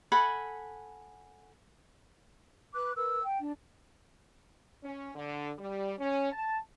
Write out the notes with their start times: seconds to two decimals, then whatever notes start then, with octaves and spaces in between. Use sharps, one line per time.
0.12 A4 F#5 G#5 B5
2.75 B4 D6 F#6
2.96 A#4 B4 E6
3.23 G5
3.40 D4
4.82 C#4
5.15 D3
5.58 G3
5.98 C#4
6.31 A5